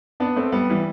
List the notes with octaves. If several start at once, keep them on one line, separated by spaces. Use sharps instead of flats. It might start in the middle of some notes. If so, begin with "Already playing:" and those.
B3 D4
A3 C4
G3 B3
E3 G3